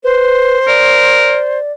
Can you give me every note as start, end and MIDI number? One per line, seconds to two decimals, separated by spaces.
0.04 0.58 71
0.04 1.59 72
0.67 1.38 70
0.67 1.72 74